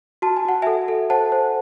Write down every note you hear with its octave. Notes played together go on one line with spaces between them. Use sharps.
F#4 A5
G#5
F#4 F#5
A4 E5 G#5
A4
C5 F#5 A5
C5